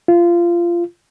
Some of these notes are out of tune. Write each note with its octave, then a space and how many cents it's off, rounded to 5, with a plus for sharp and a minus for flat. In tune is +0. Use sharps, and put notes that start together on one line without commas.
F4 -20